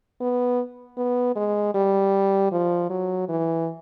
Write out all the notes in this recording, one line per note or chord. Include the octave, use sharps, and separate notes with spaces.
B3
B3
G#3
G3
F3
F#3
E3